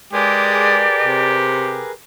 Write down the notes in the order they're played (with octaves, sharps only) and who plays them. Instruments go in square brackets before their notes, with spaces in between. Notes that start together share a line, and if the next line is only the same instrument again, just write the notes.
[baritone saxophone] G#3 [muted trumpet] G4 [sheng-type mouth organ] G#4 A#4 B4 [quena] D5
[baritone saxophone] C3